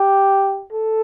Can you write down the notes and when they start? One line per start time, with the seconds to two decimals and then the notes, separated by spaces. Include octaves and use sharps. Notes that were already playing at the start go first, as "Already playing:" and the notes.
Already playing: G4
0.73 A4